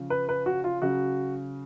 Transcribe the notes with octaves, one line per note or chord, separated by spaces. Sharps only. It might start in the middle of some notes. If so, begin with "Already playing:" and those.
Already playing: C#3 F3
B4
B4
F#4
F4
C#3 F#3 F#4